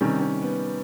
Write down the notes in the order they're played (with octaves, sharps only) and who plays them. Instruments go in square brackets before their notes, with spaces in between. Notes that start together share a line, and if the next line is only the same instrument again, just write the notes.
[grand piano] C3 D#3 G3 [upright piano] C#4
[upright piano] C#4
B3